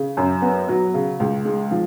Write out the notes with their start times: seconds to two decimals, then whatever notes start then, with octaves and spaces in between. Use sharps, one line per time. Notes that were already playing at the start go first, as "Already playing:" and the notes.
Already playing: C#3
0.17 F#2
0.42 B3
0.69 F#3
0.94 C#3
1.20 C#2
1.45 G#3
1.71 F3